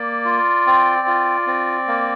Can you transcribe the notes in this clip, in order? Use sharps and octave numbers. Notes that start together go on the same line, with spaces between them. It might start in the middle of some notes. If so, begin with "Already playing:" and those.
Already playing: A#3 D5
F4
C4
F4
C4
A#3